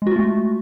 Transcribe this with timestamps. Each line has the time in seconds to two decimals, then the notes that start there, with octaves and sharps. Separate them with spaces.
0.02 G#3
0.07 F#4
0.11 F4
0.16 A3